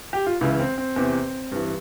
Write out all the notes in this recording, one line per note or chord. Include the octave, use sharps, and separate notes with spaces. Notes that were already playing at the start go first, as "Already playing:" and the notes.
G4
F4
C#2 C#3 E3 E4
C4
C4
E2 C3 E3
G2 E3